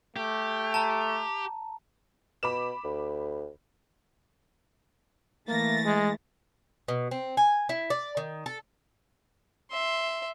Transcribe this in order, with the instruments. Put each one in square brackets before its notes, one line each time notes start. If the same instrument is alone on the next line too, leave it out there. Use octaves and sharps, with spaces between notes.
[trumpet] A3 [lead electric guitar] G4
[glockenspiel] A5 A#5
[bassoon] B2 [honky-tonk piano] B5 D6 E7
[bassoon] D2
[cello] E3 A3 [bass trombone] A#3 [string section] A6 A#6
[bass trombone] G#3
[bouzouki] B2
C4
G#5
E4
D5
D#3
A4
[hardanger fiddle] E5 C6